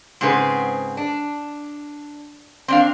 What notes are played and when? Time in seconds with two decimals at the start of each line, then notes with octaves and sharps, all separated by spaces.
0.21 G#2 C#3 C4 G#4 B4
0.97 D4
2.68 C4 D4 F5